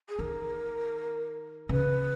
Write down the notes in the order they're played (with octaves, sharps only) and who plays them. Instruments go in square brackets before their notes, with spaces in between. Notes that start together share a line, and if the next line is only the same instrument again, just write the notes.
[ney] G#4
[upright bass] D#3 [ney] A#4
[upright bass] C#3 [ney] B4